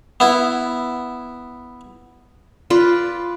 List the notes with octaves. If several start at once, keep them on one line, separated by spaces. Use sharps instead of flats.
B3 E4
F4 B4 D5